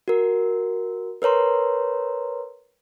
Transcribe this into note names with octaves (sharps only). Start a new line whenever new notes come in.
F#4 A#4
A#4 B4 C#5 A#5 C6